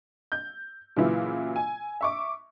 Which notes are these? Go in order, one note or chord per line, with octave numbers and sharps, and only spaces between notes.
G6
A#2 C#3 E3 F#3 E4
G#5
E5 C#6 D6